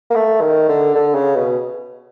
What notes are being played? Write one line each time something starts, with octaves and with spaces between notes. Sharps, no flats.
A#3
A3
D#3
D3
D3
C#3
B2